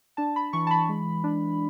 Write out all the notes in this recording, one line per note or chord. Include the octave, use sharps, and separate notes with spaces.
D4 A5
B5
E3 C#6
A5
B5
G#3
D4